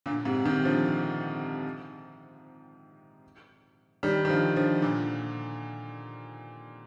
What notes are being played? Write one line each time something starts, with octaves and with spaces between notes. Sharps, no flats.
A#2 D3
G#2 C3
C3 D#3
D3 F3
D#3 G3
D#3
D3 F3
D3 F3
A#2 D3